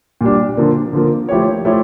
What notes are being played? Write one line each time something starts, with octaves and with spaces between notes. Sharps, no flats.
A#2 G3 D4
D3 F3 A#3
D3 F3 A#3
F3 A3 E4 G4 C#5
F3 A3 E4 G4 C#5